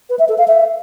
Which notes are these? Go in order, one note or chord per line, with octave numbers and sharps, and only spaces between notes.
B4
E5
A4
F5
E5